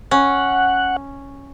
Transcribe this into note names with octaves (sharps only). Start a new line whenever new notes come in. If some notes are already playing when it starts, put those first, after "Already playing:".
C#4 F#5